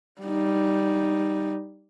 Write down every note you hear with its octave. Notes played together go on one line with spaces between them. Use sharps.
G3 D#4